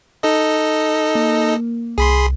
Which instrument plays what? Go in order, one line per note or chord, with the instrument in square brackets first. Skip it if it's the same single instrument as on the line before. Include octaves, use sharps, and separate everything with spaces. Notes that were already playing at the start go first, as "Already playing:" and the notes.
[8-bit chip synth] D#4 A4 D#5
[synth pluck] A#3
[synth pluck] C2 [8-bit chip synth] G#4 B5 C6